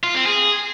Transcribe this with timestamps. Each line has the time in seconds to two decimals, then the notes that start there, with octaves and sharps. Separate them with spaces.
0.03 F4
0.15 C4
0.26 G#4